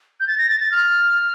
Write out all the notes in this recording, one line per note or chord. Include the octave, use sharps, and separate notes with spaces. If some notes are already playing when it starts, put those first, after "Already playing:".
G6
A6
A#6
A6
A6
F6